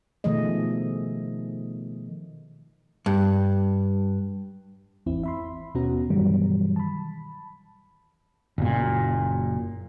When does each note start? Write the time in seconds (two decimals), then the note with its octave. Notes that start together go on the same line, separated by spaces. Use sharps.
0.24 B2 D#3 F3 A3 G#4 D#5
3.06 G2
5.06 G#1 E2 C4 E4
5.23 E5 B5 C6
5.75 D#2 B2 B3 C#4 F#4 A#5
6.10 G2 B2 D#3 E3 F#3 G3
6.76 A5 B5
8.58 F#1 A#2